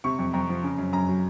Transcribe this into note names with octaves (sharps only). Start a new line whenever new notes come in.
C3 C#6
F2
F2 A#5
F3
C#3
F#2
F#2 A#5
F#3